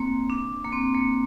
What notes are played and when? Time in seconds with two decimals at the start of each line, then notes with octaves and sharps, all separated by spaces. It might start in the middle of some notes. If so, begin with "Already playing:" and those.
Already playing: A#3 C4
0.30 D4
0.65 A#3
0.72 C4
0.94 A#3